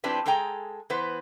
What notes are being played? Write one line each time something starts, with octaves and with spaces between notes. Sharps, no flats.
F3 C4 D4 E4 G4 B4
G#3 G#4 A4 G5 A#5
E3 B3 B4 C5